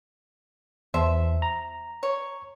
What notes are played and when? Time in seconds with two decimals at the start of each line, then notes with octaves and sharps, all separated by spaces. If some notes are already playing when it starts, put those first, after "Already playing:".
0.94 E2 F3 C5 E5
1.42 A#5
2.03 C#5